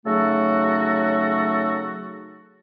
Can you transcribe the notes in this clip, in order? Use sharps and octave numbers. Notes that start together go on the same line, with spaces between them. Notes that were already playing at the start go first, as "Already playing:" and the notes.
C#3 F#3 A3 D#4 F#4 A4